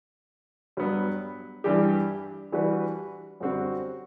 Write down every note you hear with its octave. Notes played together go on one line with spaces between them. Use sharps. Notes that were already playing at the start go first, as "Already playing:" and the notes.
G2 F#3 B3
G2 E3 G3 D4 G4
E3 G3 D4 F#4 B4
F#2 D3 G3 C4 F#4